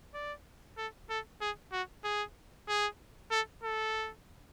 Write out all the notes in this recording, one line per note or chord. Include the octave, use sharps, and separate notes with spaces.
D5
A4
A4
G#4
F#4
G#4
G#4
A4
A4